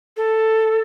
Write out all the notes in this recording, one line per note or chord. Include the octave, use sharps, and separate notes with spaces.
A4